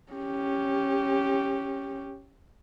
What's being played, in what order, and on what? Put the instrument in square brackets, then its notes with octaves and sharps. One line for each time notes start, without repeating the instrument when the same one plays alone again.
[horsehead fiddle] C#4 G4